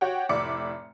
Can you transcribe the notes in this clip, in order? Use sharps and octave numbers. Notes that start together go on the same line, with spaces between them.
F#4 G4 C#5 F#5 G5
F1 A2 D5 E5 D6 C#7